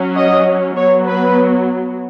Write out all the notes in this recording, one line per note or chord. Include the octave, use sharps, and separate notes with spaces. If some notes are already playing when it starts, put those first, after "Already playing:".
Already playing: F#3 C#4
D#5
F#3 B3 C#5
B4